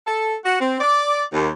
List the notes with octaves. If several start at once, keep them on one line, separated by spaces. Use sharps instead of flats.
A4
F#4
C4
D5
D#2